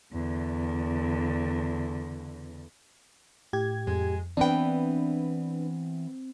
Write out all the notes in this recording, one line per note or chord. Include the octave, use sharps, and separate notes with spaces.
E2 D3
A2 G4 G#6
F2 G#3
E3 B3 C4 D4 B4 G5